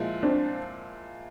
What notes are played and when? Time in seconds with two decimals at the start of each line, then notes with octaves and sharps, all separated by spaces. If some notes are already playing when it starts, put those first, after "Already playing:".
Already playing: A#2 F3 G#3 E4
0.23 C4 D4